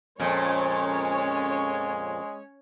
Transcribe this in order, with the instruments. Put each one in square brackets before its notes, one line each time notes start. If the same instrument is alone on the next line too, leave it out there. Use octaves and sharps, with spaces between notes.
[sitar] F2 A#2 [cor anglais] G#3 [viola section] C#4 C#5